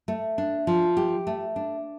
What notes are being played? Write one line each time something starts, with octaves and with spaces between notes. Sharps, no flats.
A3
D4
F3
G4
A3
D4